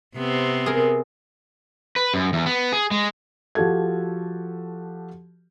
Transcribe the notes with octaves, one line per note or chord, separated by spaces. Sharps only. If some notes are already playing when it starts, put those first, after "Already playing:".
C3 B3 C4
G#4 A#4
B4
F#2
E2
B3
G#4
G#3
F3 F#4 G4 A4 G#6